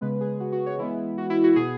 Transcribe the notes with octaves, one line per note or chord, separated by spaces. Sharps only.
C#3 G#3 B3 B4
G#4
F#4
F#4
C#5
E3 G#3 B3 E4
F#4
E4
F#4
B2 B3 G#4